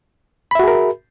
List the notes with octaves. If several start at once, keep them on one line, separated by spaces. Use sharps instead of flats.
F#4 G#4 A#4 E5 B5